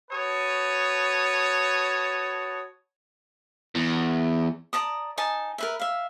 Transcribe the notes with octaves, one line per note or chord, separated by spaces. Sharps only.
F#4 B4 C#5 A5 D#6
E2
D5 A5 A#5 D#6
D#4 G#5 A5 D#6
A#4 B4 E5
E5 F5